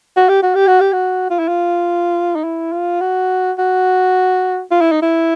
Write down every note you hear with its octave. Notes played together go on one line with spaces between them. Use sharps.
F#4
G4
F#4
G4
F#4
G4
F#4
F4
E4
F4
D#4
E4
F4
F#4
F#4
F4
E4
D#4
E4